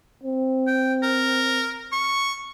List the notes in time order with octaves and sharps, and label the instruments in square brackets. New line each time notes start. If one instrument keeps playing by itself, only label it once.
[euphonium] C4
[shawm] G5
A#4
C#6